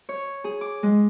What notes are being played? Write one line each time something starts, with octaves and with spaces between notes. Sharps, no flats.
C#5
G#4
D6
G#3